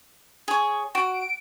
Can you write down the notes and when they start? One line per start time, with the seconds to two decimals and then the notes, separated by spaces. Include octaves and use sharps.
0.48 G#4 C#5
0.95 F#4 D7